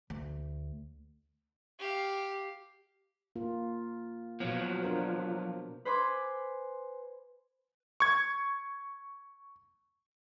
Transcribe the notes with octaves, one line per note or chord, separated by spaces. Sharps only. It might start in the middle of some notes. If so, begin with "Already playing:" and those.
D2
G4 F5
A#3 F4
B2 F3 F#3 B3
D4 A#4 C5
B4 C5 G#5 B5 C6 D6
C#6 G#6